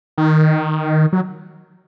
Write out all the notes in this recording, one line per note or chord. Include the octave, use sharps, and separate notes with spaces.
D#3
F#3